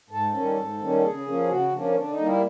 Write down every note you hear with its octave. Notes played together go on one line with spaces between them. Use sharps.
G#2 A4
D#3 G3 A#3 C#4
G#2
D#3 G3 A#3 C#4
C#3 G#4
F3 A#3 C#4
C#3 F#4
F3 A#3 C#4 D4
D3 D4
D#4
G3 A#3
E4